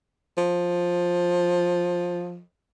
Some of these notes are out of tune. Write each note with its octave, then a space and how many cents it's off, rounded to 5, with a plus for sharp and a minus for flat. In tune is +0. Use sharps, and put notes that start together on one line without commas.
F3 +10